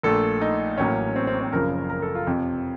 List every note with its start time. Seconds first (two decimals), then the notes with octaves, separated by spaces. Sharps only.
0.03 A#1 A#2 A3 A4
0.41 D#4
0.77 A1 A2 F#3 A#3 C#4
1.16 C4
1.27 C4
1.41 C4
1.53 F#1 F#2 C#3 F3 A#4
1.90 A#4
2.02 A4
2.15 F4
2.27 F2 C3 F3